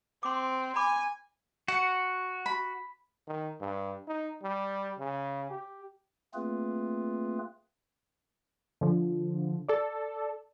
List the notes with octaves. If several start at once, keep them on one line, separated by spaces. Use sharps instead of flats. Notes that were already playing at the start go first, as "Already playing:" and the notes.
C4 C6 D6
G#5 B5 D6
F#4 F#5
B5
D#3
G2
D#4
G3
C#3
G4
A3 A#3 C4 F4 G#4 B4
D3 F3
A4 D5